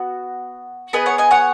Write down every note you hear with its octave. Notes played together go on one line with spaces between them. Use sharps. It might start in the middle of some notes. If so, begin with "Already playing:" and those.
Already playing: B3 F#4
B3 G#4 B4 D#5
C#5 F#5
D#5 G#5
C#5 F#5